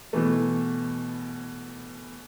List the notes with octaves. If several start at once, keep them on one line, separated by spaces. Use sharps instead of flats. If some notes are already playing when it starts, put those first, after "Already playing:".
B2 E3 A3